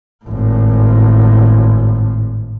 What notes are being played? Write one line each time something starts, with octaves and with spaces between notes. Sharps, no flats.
G#1 A2